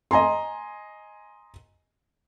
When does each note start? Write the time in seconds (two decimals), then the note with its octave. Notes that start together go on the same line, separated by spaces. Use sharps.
0.11 D#5 G#5 A#5 C6